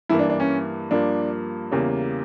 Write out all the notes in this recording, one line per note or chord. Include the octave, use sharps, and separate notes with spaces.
G2 E3 A#3 E4
D4
D4
C#4
G2 F3 A#3 D4
E2 C#3 G3 A#3